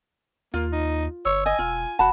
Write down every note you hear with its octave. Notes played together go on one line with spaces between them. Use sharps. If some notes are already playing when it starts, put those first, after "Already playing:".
D#2 A#3 F4
D#4
G1 C#5 E6
D#5 G#5
E1 F4
F1 F#4 F#5 A5 B5